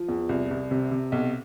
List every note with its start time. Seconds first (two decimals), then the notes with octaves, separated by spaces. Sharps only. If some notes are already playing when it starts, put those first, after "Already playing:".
Already playing: F3
0.08 E2
0.29 C2
0.51 C2
0.71 C3
0.91 C3
1.12 B1